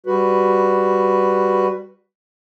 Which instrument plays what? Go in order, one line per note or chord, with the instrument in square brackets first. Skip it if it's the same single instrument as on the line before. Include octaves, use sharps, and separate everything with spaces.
[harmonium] G3 F#4 B4